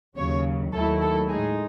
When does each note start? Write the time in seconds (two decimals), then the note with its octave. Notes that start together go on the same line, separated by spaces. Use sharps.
0.16 D#2 C#3 F#3 C#5
0.72 D#2 D#3 F#3 A3 E4 A4
1.00 A4
1.30 A2 G#3 D#4 G#4